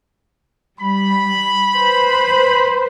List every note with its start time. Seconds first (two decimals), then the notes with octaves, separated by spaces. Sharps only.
0.80 G3 B5
1.75 B4 C5